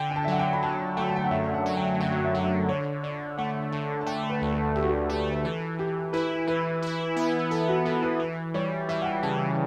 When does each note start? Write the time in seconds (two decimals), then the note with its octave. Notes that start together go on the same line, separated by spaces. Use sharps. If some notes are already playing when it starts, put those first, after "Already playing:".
Already playing: D3 G5
0.11 G5
0.16 A5
0.24 E5
0.28 F#3 F#5
0.39 G5
0.53 B5
0.62 D3 A5
0.97 A3 G5
1.09 A5
1.16 G5
1.24 F#5
1.31 F#2 E5
1.54 F#5
1.66 F#3
1.77 G5
2.00 D3 G5
2.25 E5
2.34 D3 F#5
2.69 D3 C#5
3.03 D3 D5
3.38 A3 F#5
3.72 D3 A5
4.01 A5
4.06 A3 G5
4.29 B4
4.42 D2
4.53 A4
4.75 D2 G4
4.84 F#4
4.92 G4
5.10 A3 G4
5.45 E3 A4
5.79 E3 G4
6.13 E4 B4
6.47 E3 B4
6.82 E4
7.16 B3
7.51 B3 A4
7.69 F#4
7.85 E3 A4
8.03 B4
8.20 E3
8.54 G3 C#5
8.89 E3 E5
9.02 F#5
9.06 G5
9.23 C#3 A5